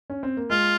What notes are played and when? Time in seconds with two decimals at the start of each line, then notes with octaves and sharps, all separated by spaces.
0.10 C#4
0.23 C4
0.37 A#3
0.50 G#3 F4